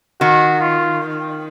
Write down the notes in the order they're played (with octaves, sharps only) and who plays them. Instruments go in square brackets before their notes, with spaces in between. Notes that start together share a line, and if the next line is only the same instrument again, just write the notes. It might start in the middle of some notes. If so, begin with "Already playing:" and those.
[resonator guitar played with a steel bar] D#3 [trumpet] F#4
[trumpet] F4